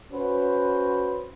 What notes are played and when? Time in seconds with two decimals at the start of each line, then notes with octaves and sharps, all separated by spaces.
0.12 C#4 F#4 B4 C5